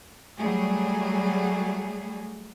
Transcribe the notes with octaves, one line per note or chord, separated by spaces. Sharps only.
F#3 G3 A3 G#4